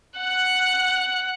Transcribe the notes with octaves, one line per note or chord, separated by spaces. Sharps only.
F#5 F#6